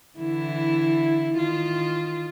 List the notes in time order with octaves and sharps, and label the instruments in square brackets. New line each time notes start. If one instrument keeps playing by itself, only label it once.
[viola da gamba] D3 E3 E4
D#3 F4